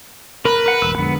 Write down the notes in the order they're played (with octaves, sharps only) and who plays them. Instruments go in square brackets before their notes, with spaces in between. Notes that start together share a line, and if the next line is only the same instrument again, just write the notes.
[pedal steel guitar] A#4 [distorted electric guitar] B4
[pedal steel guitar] A#4 F#5
[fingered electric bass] E1 A1 [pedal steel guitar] E6
[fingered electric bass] F2 D3 G#3 [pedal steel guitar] B3